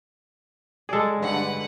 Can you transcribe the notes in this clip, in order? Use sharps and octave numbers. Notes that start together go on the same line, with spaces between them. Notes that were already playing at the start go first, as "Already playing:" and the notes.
G#3 G#4 A4 D5
G2 D3 B4 F#5